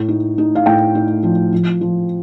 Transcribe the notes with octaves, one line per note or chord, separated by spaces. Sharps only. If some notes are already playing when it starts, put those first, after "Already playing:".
Already playing: A2
D#4
D#4
F5
A2 G5
D#4
F3
F3
F3